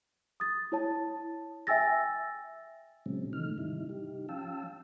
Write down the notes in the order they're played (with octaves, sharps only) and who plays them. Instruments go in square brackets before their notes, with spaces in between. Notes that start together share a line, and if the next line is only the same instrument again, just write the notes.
[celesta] D#6 A6
E4 C#5 A5
E5 G5 G#5 E6 A6 A#6
[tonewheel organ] A#2 C#3 F#3 G#3 C4 C#4
C3 D#3 E3 A3 D#4 F6
G#2 C3 D#3 G3 D#4 E4
D#4 G4
F3 C#4 F5 G5 A5 E6